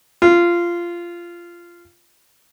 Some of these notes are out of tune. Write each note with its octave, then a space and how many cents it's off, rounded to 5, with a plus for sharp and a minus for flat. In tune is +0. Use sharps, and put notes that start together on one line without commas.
F4 -15